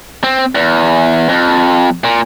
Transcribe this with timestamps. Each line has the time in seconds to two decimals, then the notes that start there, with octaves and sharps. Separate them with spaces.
0.24 C4
0.55 E2
1.29 F2
2.04 A#2